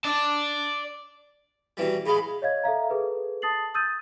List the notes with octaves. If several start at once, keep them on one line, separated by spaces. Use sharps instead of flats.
D5 A5
B2 E3 G3
A2 G#3 G#4 F5 B5
C#5 D#5 F5 G#6
A4 E5 F5 A#5
G#4 A4 B4
A5 D#6 A6 C7 F#7
D#6 E6 G6 A6 D#7